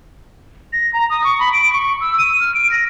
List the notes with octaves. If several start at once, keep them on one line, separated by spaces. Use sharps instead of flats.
A#6
A#5
D#6
C#6
B5
D7
C#6
E6
D#7
F6
D7
A#6